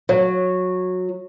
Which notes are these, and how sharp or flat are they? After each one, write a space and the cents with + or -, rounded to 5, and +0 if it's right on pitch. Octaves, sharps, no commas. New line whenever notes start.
F#3 -15